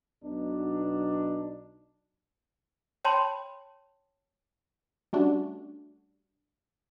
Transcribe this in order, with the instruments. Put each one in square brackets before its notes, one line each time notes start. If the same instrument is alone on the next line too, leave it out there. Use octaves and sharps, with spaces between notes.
[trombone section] B1 B2 D4 D#4
[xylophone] C#5 G5 A5 B5 C6
[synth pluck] G3 A3 C#4 D4 F#4